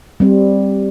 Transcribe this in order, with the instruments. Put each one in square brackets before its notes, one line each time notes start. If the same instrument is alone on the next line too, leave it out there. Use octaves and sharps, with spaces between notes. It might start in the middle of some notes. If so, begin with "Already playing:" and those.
[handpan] G3 C4